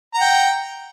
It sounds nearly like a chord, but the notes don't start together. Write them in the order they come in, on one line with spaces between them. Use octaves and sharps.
A#5 F#5 G5